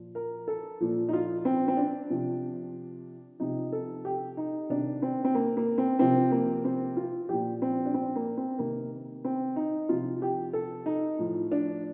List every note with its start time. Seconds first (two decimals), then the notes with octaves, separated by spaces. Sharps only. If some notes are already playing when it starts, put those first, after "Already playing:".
Already playing: A#2 F3
0.15 A#4
0.48 A4
0.80 A#2 F3
1.09 D#4
1.13 F4
1.45 C4
1.68 C4
1.77 D4
2.10 C3 F3
3.39 C3 F3 D#4
3.72 A4
4.05 G4
4.37 D#4
4.70 C3 D#3 D4
5.02 C4
5.24 C4
5.35 A#3
5.57 A#3
5.78 C4
5.99 C3 F3 C4
6.31 A#3
6.65 C4
6.97 F4
7.29 A#2 F3 G4
7.62 C4
7.85 D4
7.94 C4
8.16 A#3
8.37 C4
8.59 C3 D#3 A#3
9.25 C4
9.56 D#4
9.89 C3 F3 F4
10.22 G4
10.53 A4
10.86 D#4
11.19 A2 F3
11.52 D4